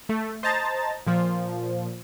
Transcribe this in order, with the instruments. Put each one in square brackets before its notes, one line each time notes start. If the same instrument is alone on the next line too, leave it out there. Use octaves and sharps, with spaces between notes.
[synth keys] A3
C5 D#5 A5 A#5 A6
A#2 F3